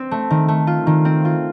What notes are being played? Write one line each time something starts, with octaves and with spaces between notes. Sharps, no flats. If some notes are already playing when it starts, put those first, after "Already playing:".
Already playing: C4
A3
D#3
A3
F4
D#3
C4
F4